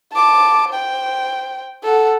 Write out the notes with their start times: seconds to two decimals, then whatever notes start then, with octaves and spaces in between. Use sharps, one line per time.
0.13 A5 D6
0.70 C5 G5
1.84 A4 F#5